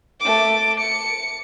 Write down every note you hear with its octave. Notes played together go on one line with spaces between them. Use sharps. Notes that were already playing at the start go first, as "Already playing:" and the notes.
A3 D6
C#7